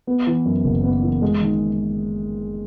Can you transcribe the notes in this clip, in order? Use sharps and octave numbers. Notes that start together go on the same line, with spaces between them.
B3
E3
F#2
F#1
B3
E3
G#3
D#3